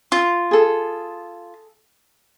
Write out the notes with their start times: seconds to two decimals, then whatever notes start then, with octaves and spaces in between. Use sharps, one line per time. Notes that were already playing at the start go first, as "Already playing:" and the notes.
0.12 F4
0.51 G#4 A4